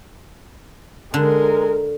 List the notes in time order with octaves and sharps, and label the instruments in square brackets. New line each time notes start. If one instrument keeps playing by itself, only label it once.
[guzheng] D3 [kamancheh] G#3 A#4